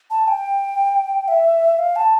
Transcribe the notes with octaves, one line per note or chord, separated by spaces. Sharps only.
A5
G5
E5
F5
A5